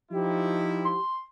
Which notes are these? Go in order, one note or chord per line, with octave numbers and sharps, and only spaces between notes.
F3 D#4 E4 G4
C6